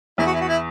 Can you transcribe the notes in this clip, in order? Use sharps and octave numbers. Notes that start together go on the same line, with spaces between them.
E2 E4
F#4
E4
F#4
E4